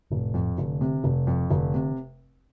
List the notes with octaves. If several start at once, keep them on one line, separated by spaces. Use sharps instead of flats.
F1 A2
F2
F1 D3
C3
F1 C3
F2
F1 D3
C3